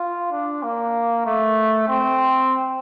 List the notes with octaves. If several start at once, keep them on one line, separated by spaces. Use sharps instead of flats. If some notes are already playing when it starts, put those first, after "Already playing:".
Already playing: F4
D4
A#3
A3
C4